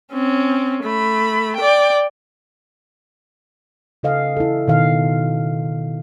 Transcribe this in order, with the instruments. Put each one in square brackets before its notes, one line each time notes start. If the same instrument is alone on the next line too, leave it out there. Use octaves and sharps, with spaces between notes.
[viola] C4 C#4
A3 B5
D5 G5
[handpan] C#3 A4 D#5 F5
E4 A4
B2 D#3 F5